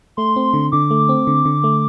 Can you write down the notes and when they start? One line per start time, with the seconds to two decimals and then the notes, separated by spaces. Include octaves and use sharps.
0.17 A3 C6
0.36 C4
0.54 D3
0.72 D3 D6
0.91 A3
1.09 C4
1.27 D3
1.45 D3
1.64 A3